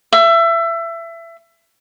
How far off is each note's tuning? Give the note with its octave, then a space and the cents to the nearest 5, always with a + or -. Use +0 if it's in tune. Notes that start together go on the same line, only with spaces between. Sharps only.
E5 +25